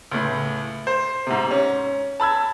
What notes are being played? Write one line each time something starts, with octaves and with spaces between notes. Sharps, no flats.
C#2 A2
C5
G#2 C3
C#4
A5 B5 E6 G#6